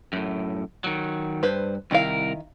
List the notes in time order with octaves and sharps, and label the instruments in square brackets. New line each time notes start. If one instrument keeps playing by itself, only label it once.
[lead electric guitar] F#2 A2
D#3 F#3
[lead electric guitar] G2 [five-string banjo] B4 C5
[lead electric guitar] C2 A#4 [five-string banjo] D#3 E4 F5